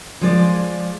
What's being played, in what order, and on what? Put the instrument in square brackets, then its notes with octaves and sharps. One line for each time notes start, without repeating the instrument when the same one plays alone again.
[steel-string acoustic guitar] F3 G#3 D5